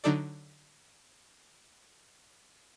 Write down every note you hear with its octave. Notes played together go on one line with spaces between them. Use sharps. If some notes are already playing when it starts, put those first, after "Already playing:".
D3 F#3 D4 D#4 A4 D5